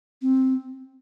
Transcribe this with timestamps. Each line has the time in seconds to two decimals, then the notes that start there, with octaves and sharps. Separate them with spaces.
0.22 C4